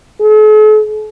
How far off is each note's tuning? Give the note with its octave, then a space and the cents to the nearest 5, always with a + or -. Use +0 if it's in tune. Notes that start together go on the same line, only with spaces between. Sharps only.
A4 -45